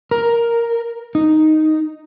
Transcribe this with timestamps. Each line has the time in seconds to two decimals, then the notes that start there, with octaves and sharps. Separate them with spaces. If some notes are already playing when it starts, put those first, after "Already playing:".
0.11 A#4
1.15 D#4